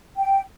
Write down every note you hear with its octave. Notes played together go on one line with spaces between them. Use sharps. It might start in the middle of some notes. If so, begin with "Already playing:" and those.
G5